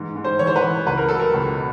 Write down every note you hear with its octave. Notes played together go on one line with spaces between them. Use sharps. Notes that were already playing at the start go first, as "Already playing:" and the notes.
Already playing: G#2 E3
G#2
C5
E3 C#5
C5
B4
E3
C#2 B4
A#4
F#3 A4
A#4
C#2
B2